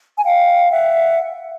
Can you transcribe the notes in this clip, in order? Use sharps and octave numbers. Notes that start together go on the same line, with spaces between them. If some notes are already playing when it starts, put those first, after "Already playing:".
G#5
F5 G5
E5 F#5